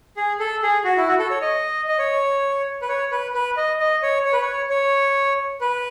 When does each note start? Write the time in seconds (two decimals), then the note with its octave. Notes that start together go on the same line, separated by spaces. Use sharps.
0.17 G#4
0.40 A4
0.63 G#4
0.84 F#4
0.97 E4
1.07 F#4
1.19 A4
1.30 C#5
1.41 D#5
1.88 D#5
1.98 C#5
2.82 B4
2.89 C#5
3.11 B4
3.34 B4
3.57 D#5
3.80 D#5
4.03 C#5
4.25 C#5
4.33 B4
4.41 C#5
4.70 C#5
5.61 B4